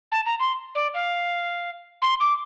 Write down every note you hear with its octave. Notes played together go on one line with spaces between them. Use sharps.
A5
A#5
C6
D5
F5
C6
D6